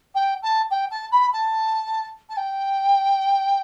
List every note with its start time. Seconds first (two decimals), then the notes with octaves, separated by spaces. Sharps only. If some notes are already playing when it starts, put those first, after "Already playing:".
0.15 G5
0.43 A5
0.71 G5
0.91 A5
1.12 B5
1.33 A5
2.30 A5
2.37 G5